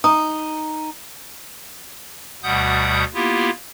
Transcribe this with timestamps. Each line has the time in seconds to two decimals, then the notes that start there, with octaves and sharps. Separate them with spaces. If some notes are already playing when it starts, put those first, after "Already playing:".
0.04 D#4 A#5 D#6
2.43 D2 B2 G3 F#5 D#6 G6
3.14 A#3 B3 E4 F4 G4